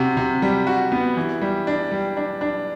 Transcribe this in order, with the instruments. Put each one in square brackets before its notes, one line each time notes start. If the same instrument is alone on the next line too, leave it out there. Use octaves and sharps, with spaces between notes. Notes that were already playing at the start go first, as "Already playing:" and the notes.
Already playing: [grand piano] C3 F#4
C3
G3
F#4
B3
E3
G3
D4
G3
D4
D4